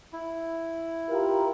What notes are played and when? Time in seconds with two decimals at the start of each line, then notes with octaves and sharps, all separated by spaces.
0.13 E4
1.09 F4 G4 A#4